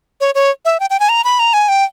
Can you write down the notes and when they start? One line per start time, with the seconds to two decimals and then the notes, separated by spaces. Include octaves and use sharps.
0.21 C#5
0.35 C#5
0.65 E5
0.80 G5
0.90 G5
1.00 G#5
1.09 A#5
1.24 B5
1.39 A#5
1.53 G#5
1.68 G5